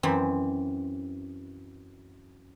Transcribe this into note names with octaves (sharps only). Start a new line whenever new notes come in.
F#2 E3 C4